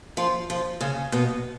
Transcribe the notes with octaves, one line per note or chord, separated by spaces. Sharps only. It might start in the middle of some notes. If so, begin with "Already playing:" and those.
F3 F4
F3 F4
C#3 C#4
B2 B3